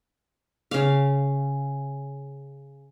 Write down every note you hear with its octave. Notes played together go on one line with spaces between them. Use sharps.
C#3 F5